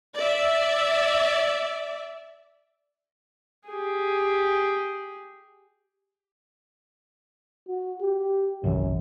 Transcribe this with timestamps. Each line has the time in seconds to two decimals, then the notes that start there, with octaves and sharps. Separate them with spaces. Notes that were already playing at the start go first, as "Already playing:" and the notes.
0.16 D5 E5
3.68 G4 G#4
7.68 F#4
8.01 G4
8.64 G1 C2 F#2 E3